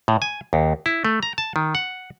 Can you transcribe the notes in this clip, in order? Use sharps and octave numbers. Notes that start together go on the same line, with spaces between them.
A2
G#5
D#2
E4
A3
A#5
A5
D#3
F#5